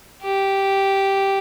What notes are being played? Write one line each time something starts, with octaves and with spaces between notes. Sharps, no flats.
G4